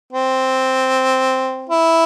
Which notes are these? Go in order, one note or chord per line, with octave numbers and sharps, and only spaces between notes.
C4
E4